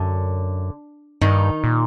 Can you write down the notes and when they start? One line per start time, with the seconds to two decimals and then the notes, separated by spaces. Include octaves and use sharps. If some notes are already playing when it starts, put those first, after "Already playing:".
Already playing: F#2 D3
1.21 G2 D#3 D#4
1.64 A#2